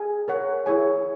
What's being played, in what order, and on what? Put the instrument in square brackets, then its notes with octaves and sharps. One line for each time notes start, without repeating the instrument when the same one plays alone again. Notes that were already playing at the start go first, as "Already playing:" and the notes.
Already playing: [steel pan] G#4 G#5
A#4 C#5 F#5
E4 G#4 C#5 G#5